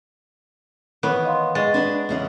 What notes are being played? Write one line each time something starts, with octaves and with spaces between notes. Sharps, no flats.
D#3 E3 B3 C#5
D#5 F5 C6
G#3 D#5 C#6 A6
D4 B4 F#5
E2 C#3 F#5